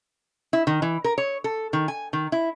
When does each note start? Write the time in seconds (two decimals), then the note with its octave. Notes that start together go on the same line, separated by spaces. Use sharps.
0.53 E4
0.67 D#3
0.82 E3
1.04 A#4
1.18 C#5
1.44 A4
1.73 D#3
1.88 G#5
2.13 D#3
2.32 E4